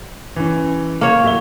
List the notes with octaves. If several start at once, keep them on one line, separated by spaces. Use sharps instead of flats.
E3 C#4
A#3 C#5
D1 E5 G7